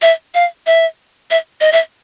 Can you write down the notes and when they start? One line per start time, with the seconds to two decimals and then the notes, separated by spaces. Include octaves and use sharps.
0.02 E5
0.34 F5
0.66 E5
1.30 E5
1.61 D#5
1.72 E5